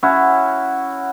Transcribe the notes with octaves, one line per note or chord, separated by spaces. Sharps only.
C#4 E4 F#4